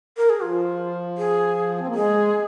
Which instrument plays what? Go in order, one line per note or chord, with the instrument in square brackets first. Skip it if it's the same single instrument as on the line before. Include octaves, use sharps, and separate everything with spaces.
[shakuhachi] A#4
G#4
[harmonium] F3 [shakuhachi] F4
[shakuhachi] G#4
[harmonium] C4
A#3
[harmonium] G#3 [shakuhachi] G#4